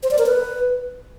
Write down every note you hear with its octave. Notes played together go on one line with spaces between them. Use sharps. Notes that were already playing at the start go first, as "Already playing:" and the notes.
C5
D5
A#4
B4